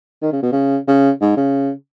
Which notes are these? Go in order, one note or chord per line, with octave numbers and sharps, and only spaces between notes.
D#3
C#3
B2
C#3
C#3
G#2
C#3